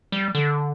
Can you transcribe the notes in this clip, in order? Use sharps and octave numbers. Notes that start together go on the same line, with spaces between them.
G3
D3